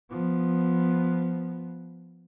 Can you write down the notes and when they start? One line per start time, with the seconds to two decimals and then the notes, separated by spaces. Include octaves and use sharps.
0.11 F3 B3